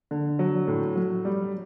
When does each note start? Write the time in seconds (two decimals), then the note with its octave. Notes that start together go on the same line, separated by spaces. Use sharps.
0.11 D3
0.39 F#3
0.68 A2
0.96 F#3
1.25 G3